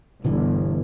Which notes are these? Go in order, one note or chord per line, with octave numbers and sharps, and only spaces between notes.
G1 B2 D3 E3